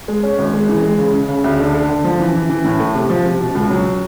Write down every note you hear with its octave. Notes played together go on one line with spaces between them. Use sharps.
G#3
C#4
G#1
G#3
E3
G#3
C#3
C#3
C#3
D2
D3
D3
D3
F3
E3
E3
E3
A2
A3
C3
F3
C3
B2
C#2
F#3